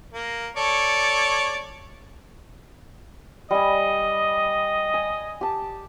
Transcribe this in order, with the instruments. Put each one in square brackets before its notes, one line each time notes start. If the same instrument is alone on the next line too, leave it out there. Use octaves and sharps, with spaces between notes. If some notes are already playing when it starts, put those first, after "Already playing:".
[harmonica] A#3
A4 C#5 D5
[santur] G3 G#5 [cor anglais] D#5
[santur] G#5
G4 A5